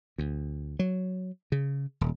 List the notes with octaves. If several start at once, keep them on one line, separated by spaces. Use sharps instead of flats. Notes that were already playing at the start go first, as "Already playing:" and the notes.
D2
F#3
C#3
D#1